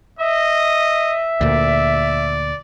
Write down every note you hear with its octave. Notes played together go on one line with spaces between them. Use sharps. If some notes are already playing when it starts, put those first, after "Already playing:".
D#5 E5
D2 A#2 D5